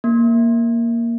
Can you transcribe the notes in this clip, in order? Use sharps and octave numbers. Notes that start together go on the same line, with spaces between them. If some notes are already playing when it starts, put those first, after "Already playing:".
A#3